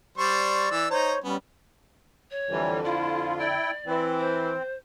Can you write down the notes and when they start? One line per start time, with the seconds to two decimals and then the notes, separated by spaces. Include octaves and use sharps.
0.18 G3 C5 D5 C#6
0.71 E3 E6
0.91 D#4 C5 C#5 A#5
1.24 G3 B3 C#4
2.31 C#5
2.50 F2 D3 E3 G3
2.84 E4 F4
3.39 E4 D5 G5
3.87 E3 C4
4.19 C5